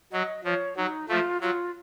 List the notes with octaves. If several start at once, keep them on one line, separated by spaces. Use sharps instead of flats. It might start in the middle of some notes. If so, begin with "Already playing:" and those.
F#3 D#5
F3 C#5
F#3 D#4
F3 A3 F4
F#3 F4